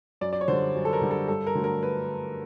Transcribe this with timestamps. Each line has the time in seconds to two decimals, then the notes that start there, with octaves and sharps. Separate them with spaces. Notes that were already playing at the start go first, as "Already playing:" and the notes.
0.21 F#2 D5
0.33 D5
0.41 C#5
0.48 D3 G3 C5
0.75 F#2
0.85 A4
0.93 A#4
1.02 D3 G3
1.11 A4
1.28 G2 A4
1.47 A#4
1.55 D3 F#3 A3
1.64 A#4
1.83 B4